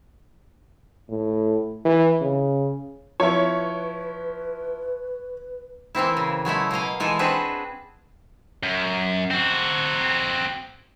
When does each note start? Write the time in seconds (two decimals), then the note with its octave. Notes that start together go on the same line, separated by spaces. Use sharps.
1.09 A2
1.85 E3
2.21 C#3
3.20 F3 E4 B4 C#5
5.95 E3 A#3 C4 E4
6.17 C#3
6.45 F#3 G#3 A3 E4
6.71 B2 A#3 D#5 F5
7.00 E3 G#3 D#4 A4 G#5
7.19 C4 D4 F#4 G#4 B4
8.63 F#2
9.31 C4 F#4